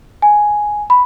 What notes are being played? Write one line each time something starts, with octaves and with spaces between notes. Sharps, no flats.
G#5
B5